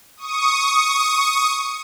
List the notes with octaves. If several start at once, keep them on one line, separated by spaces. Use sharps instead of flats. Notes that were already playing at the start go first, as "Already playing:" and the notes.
C#6 D#6